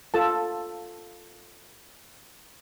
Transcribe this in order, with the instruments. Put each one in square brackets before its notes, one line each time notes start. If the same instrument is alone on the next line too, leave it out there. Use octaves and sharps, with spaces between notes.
[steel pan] F4 A4 A5